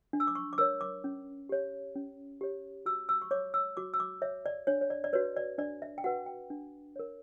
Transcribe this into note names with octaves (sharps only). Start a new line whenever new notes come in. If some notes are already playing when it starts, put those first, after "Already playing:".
D4
E6
D6
C#6
D6
A#4 C#5 E6
D6
C#4
G4 C#5
C#4
G4 C#5
F#4 E6
E6
C#6
C#5 D6
E6
F#4 D6
E6
D6
C#5 E5
D5
D4 C#5
C#5
D5
D5
F#4 B4 C#5
D5
D4 D5
E5
G5
F#4 B4 F#5
G5
D4
A#4 C#5